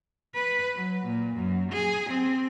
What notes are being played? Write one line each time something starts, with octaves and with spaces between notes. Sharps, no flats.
B4
F#3
A#2
F#2
G#4
C4